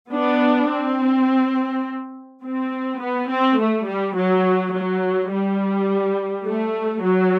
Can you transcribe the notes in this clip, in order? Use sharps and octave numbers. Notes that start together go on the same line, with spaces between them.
B3 D4
C4
C4
B3
C4
A3
G3
F#3
F#3
G3
A3
F#3